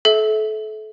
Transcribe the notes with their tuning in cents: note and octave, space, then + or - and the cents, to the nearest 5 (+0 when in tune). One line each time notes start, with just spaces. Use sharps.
A4 -30 E5 -20